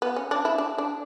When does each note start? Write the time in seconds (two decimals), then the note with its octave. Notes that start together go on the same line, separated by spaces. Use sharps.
0.02 B3
0.16 C#4
0.31 D4
0.45 E4
0.58 D4
0.78 D4